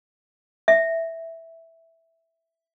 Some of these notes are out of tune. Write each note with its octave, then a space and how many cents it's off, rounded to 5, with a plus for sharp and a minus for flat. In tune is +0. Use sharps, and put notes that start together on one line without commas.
E5 -5